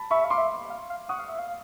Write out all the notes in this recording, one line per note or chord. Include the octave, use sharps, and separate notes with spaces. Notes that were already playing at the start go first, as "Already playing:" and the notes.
Already playing: A5 B5
E5 B5 C#6
F5
C6 D6
E5
F5
F5
F#5 C#6 D#6
F5
E5
F5